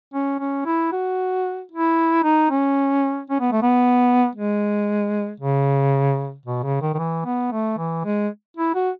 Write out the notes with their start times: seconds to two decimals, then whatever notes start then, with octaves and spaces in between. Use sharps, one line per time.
0.14 C#4
0.40 C#4
0.66 E4
0.92 F#4
1.71 E4
2.24 D#4
2.50 C#4
3.30 C#4
3.40 B3
3.52 A3
3.62 B3
4.36 G#3
5.40 C#3
6.46 B2
6.63 C#3
6.82 D#3
6.94 D#3
6.99 E3
7.25 B3
7.52 A3
7.78 E3
8.05 G#3
8.57 E4
8.75 F#4